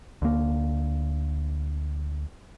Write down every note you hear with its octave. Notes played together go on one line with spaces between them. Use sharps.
D2 A#3